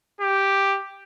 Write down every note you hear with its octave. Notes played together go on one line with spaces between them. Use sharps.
G4